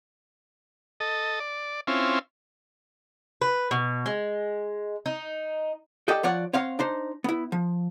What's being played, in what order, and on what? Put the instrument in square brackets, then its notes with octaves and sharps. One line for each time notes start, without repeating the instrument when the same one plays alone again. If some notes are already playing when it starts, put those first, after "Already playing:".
[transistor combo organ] A4 D#5
D5
C4 C#4 E4 F4
[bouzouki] B4
B2
G#3
D#4
[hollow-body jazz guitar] G4 A4 D5 D#5 G5
F3 F4 C#5 D5 F#5
C4 C#5 F5 F#5 C6
D4 D#4 C5
B3 E4
F3